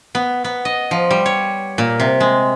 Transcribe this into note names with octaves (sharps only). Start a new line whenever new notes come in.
B3
B3
D#5
F3
G3
C#5
A#2
C3
G#3